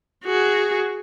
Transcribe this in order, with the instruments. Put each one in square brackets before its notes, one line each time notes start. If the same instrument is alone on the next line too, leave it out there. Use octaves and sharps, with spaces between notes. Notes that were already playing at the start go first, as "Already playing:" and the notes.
[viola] F#4 G#4